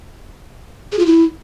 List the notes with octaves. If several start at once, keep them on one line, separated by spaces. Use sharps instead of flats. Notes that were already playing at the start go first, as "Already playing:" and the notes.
G#4
F4
E4